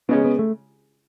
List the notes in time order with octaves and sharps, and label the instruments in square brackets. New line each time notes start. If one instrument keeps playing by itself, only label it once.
[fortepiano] C#3 G#3 C#4 [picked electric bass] B3
[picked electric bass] B3
A3